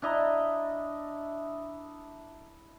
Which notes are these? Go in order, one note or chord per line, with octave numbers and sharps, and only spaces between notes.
D4 E4 D#5 A#5